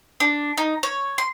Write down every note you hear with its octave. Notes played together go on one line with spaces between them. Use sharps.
D4
D#4
C#5
C6